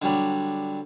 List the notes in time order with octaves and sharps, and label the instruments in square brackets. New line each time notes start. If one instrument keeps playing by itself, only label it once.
[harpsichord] D3 F#3 G3